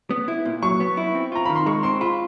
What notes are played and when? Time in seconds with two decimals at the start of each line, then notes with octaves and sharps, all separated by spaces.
0.11 B3
0.28 E4
0.45 A#2
0.63 F#3 C#6
0.80 B3
0.97 E4
1.15 C4
1.32 F4 A#5
1.46 D#3 B5
1.56 C6
1.66 G#3 C#6
1.83 C4 C6
2.01 F4 B5